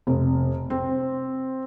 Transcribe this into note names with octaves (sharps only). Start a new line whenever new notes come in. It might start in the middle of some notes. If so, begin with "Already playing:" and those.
F1
C4